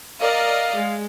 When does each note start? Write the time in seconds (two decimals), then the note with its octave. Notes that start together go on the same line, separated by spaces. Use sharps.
0.20 A#4 D5 D#5 F5
0.73 G#3